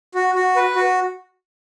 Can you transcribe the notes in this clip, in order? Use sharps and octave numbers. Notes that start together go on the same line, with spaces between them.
F#4
F#4
B4
F#4